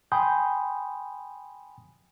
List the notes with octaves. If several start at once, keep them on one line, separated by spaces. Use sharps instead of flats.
G5 G#5 B5 C6 D#6 G6